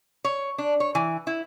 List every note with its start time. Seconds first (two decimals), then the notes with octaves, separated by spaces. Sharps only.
0.24 C#5
0.58 D4
0.80 C#5
0.95 E3
1.27 E4